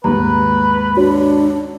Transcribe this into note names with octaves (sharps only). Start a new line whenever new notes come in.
D#2 G#2 B4 A#5
D4 F#4 C#5